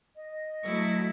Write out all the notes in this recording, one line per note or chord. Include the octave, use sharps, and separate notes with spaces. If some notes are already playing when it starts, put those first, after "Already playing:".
D#5
F#3 A3 E4 C#6